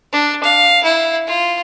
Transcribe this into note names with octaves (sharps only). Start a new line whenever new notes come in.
D4
F5
E4
F4